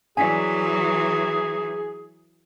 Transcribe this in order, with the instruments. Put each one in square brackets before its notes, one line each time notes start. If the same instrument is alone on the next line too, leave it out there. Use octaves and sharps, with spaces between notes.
[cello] E3 F#3 [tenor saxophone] G#4 [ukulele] D5 G#5